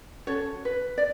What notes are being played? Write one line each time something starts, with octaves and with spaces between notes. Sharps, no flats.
C#4 F#4 A4 C#5
B4
D5